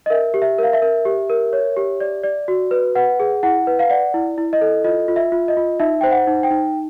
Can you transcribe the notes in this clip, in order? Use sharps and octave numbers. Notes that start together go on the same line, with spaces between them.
D#5
A#4 E5
G4
E5
A#4 F5
E5
A#4
G4
A#4
C#5
G4
D5
D5
F#4
B4
B4 F#5
G#4
E4 F#5
B4
F5
D5 F#5
E4
E4
D#5
A4
F4 D#5
F4
E5
F4
D#5
F4
D#4 E5
C5 G5
F#5
D#4
G5
D#4